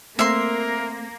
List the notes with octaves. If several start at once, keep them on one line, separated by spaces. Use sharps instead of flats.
A3 A#3 C4 A#4 E5 C6